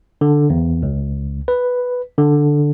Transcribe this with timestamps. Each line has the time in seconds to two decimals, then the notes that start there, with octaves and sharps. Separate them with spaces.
0.21 D3
0.50 E2
0.83 C#2
1.48 B4
2.18 D3